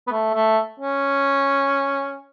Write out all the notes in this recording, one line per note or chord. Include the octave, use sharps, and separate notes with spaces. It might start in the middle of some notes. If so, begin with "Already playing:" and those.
B3
A3
A3
C#4